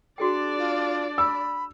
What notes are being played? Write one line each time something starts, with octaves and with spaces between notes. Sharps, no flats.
D4 F#4 G#4 D5 G5
F4
B5 E6